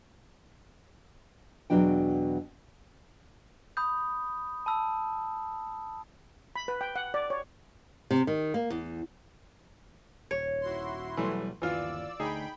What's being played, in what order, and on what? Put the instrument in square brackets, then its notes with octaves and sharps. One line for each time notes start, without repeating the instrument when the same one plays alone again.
[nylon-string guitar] E2 B2 F#3 D4 G5
[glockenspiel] B5 D#6 G6
A5 B5 E6
[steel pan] B5
B4
G5
F#5
D5
C#5
[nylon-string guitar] C3
D#3
A#3
E2
[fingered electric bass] D#1 [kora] C#5
[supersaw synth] E4 F#4 C6
[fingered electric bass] B2 F#3 G3 [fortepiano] E3 A3
[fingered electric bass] G1 D#2 [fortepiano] E3 F4 [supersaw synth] D5 E6
[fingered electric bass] D2 [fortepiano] D#4 G#4 [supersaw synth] G5 B5